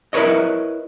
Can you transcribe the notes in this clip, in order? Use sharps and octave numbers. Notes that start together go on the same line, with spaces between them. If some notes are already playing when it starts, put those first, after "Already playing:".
E4 A#4 B4 C#5 D#5